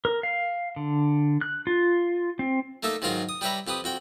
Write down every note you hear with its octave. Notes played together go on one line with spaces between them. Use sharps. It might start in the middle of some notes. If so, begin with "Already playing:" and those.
A#4
F5
D3
F#6
F4
C4
A3 A#3 D#4 A4 E5
G#2 D#3 F#3 G#3 F4 A#4
D#6
G3 G4 B4 C#5 E5 A#5
F2 G4 B4 D#6
F2 F#4 G5